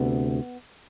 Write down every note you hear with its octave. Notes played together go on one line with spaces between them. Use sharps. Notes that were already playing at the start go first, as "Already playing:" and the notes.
Already playing: D2 C3 B3